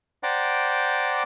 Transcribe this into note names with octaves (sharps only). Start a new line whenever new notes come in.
C5 D5 F#5 G5 A#5 D6